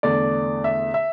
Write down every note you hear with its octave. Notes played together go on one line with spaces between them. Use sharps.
E2 D3 A3 D5
E5
E5